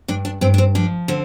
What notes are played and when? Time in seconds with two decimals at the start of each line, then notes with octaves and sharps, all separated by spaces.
0.08 G2 D4
0.25 D4
0.41 G2 C4
0.54 D4
0.58 C4
0.75 F3 D4
1.08 D3 C4